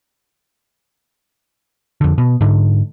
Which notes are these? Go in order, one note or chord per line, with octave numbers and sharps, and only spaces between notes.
F2 D3
B2
G#2 D3